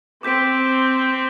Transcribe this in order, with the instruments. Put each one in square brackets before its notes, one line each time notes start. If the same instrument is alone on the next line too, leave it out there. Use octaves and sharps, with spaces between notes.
[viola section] C4 [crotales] D6 G6 B6 D7